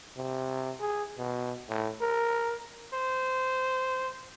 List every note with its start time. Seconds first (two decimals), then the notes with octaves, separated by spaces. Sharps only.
0.17 C3
0.80 G#4
1.18 B2
1.69 A2
2.01 A#4
2.94 C5